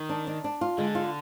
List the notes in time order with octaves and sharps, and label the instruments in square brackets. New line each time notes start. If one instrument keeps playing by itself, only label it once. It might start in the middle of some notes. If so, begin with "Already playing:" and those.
Already playing: [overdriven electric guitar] D#3
[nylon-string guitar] D4
D4
D4
F4
[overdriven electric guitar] D3 [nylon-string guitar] G#3
[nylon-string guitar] F4